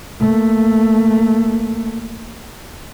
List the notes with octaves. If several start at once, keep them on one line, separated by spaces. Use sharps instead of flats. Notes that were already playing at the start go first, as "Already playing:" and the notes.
A3 A#3